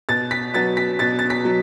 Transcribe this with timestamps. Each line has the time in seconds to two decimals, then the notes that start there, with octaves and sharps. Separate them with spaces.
0.09 B2 A6
0.31 B6
0.54 F#3 B3 A6
0.77 B6
0.99 B2 A6
1.19 A6
1.30 B6
1.45 F#3